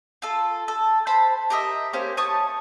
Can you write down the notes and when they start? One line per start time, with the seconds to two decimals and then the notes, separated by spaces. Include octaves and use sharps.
0.22 F4 A4
0.68 A4
1.07 C5 A5 B5
1.50 G4 A#4 D#5 E5
1.93 A#3 C#4 G4 C5
2.17 C#5 A5 C#6 D#6